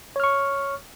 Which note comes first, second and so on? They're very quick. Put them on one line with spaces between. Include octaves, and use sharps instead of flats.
C#5 F6 C#6